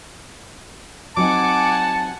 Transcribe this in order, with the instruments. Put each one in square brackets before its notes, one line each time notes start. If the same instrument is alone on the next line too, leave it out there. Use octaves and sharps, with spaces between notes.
[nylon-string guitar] F#3 C4 D#4 [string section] F#5 G#5 [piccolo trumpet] A5 [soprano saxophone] D6